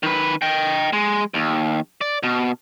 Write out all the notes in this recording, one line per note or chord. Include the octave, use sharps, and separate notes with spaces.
D#3 B4
D#5 G5
G#3
D#2
D5
B2